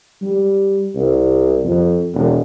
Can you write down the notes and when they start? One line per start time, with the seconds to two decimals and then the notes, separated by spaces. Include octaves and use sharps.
0.22 G3
0.96 C2
1.65 F2
2.14 E1